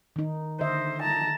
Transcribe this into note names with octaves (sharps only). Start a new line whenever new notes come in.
D#3 D#4
D3 C5 D#5 E5
A5 A#5